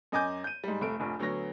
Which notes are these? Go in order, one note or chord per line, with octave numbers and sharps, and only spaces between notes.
F#2 D#5 G#5 D6 G6
G6 D#7
G#2 G3
F1 A3 D7
F1 A#1
D2 F#3 B3 C#5 A#6